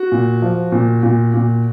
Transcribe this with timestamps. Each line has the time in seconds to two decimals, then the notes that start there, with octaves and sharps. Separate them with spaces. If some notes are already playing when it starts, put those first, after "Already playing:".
Already playing: F#4
0.12 A#2
0.42 F3
0.72 A#2
1.03 A#2
1.34 A#2